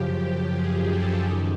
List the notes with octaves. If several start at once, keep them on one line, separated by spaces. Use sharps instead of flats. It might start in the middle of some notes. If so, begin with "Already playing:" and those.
Already playing: F#2 C#3 F3 G4
G#4
A4
F#2 D#3